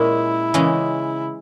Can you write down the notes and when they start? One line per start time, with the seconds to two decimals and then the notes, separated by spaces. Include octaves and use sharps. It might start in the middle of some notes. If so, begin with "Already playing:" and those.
Already playing: A#2 G#3 C#4 E4
0.54 C#3 E3 G#3 C#4